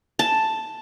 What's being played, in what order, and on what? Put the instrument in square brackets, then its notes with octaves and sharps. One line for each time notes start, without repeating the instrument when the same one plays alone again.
[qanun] A5